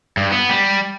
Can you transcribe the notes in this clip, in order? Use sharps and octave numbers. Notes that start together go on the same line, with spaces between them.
G2
B3
G3